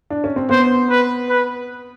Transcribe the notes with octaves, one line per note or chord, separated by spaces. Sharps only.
D4
C#4
C4
B3 C5
B4
B4